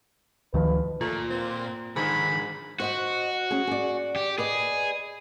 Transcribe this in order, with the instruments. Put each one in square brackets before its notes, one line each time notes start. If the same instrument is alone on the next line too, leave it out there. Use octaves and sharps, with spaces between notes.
[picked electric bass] D2 D#3 F3 [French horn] B4
[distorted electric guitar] A#2 [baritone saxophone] A3 [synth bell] F4
[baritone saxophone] C4
[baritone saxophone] G#2 [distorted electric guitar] D3 D#3 [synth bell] G#5 [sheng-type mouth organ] B5
[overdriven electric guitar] F#4 [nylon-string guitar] C5 D#5 F#5
[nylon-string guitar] C#4 G#4
G#4 D5
[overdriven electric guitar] G4
[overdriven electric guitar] G#4 [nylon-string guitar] B4 D5 D#5